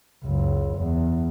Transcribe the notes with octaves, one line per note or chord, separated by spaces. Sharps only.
F#1 C#2
E2